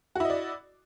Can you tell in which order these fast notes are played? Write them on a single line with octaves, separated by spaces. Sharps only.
F#4 E4 D#5 D5